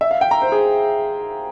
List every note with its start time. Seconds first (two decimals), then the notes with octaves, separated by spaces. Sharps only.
0.01 E5
0.11 F5
0.21 G5
0.31 A#5
0.42 C5
0.52 G#4